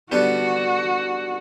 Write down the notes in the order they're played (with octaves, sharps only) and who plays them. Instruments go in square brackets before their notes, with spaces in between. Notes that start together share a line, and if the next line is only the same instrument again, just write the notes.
[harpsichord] D3 G3 B3 [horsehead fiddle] F#4